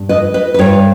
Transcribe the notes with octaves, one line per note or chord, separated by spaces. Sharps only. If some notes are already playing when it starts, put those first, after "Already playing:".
Already playing: G2
B4 D#5
B4 D#5
B4
G2 G3 A#4 C#5